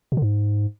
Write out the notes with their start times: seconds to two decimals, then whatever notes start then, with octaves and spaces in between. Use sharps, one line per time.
0.12 B2
0.17 D3
0.22 G#2